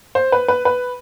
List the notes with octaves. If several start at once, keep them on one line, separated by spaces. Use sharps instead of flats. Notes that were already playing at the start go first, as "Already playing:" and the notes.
C5
B4
B4
B4